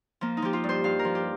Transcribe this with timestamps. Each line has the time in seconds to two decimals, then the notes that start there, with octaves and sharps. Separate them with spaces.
0.21 F3 A#3
0.37 D#4
0.42 F3 G4
0.53 F4
0.64 G2
0.69 C5
0.84 G2 F5
0.99 A#4
1.05 F3
1.15 G4